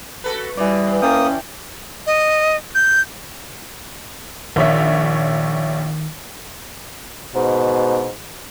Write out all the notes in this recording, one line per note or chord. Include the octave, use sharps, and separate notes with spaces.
F#4 A4 B4
B2 E3 G3 D5
B3
A#3 C#4 G5 A5 D#6
D#5
G6
A#1 D#3 C#5 E5
G#2 B2